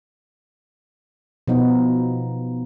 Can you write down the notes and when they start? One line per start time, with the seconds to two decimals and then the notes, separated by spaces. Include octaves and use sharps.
1.48 B2 F3 B3 D#4